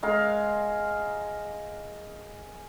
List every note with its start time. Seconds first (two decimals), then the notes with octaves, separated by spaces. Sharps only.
0.03 G#3 A#4 F5